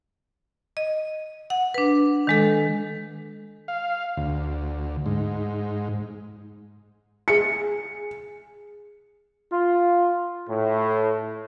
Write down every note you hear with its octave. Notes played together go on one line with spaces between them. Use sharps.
D#5
F#5
D4 B4
D#3 G#3 A4
F5
D2
G#2
G#4 C#7
F4
A2